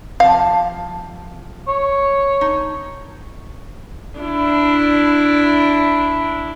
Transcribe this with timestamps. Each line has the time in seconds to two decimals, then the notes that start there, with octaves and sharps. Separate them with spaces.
0.20 C3 F3 F5 A5
1.68 C#5
2.41 D#4
4.20 D4 E4